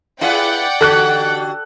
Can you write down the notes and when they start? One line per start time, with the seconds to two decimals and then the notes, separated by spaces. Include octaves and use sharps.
0.21 E4 G#4 B4 D5 F#5 G5
0.81 D3 F#4 G4 A4 F#6